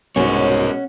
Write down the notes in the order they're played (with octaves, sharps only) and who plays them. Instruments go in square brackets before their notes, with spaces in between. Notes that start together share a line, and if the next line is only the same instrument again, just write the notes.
[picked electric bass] C2 G#2 [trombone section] B2 G#3 [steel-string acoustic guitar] C#4 F#4 [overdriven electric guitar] A#4 C#5